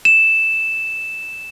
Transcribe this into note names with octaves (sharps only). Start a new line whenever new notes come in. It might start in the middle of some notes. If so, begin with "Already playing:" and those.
E7